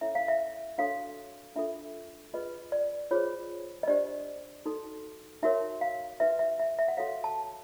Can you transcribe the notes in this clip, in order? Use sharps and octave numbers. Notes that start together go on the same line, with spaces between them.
C#4 E4 A4 C#5 E5
F5
E5
D4 F#4 A4 C#5 F5
D4 F4 A4 E5
F4 G#4 B4 D#5
D5
F4 G#4 C5 C#5
D#5
D4 G4 C5 D5
D#4 F#4 A4
D#4 F#4 A#4 C#5 E5
F5
D#4 F#4 B4 E5
E5
E5
E5
F#5
F#4 A4 C#5 F5
A5